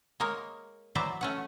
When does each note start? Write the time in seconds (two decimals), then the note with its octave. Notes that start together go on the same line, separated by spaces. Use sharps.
0.20 G#3 A#3 A#4 C#5
0.95 E3 F#3 C5 D5 E5 A#5
1.21 A3 C#4 F#5